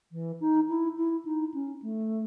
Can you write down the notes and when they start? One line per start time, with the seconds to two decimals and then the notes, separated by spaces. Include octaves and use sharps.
0.12 E3
0.40 D#4
0.68 E4
0.96 E4
1.25 D#4
1.53 C#4
1.82 A3